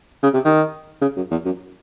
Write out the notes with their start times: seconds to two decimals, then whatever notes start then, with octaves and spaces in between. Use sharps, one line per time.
0.23 C#3
0.34 C3
0.45 D#3
1.01 C#3
1.16 F#2
1.31 E2
1.45 F#2